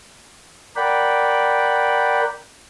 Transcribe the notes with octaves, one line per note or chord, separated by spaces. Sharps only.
A#4 D5 F#5 G5 B5